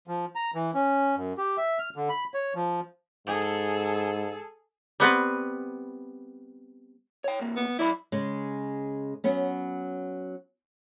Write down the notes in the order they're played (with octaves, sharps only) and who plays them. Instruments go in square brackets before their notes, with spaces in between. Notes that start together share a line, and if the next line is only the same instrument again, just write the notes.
[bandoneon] F3
A#5
E3
C#4
F#2
G4
E5
F6
D3
B5
C#5
F3
[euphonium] G#2 [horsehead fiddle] G#4 A4
[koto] G3 B3 C4 B4
[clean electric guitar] C#5 G5
C2 A#3
[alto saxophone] B3
[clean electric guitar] F#2 D5 B5 [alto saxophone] E4
[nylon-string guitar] C#3 G#3
F#3 B3 C#4